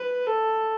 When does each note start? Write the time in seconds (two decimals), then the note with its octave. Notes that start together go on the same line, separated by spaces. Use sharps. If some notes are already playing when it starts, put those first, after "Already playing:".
Already playing: B4
0.26 A4